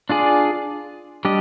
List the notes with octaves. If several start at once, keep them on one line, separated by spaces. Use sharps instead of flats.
D4 F4 G#4 D5
G3 D4 G4 D#5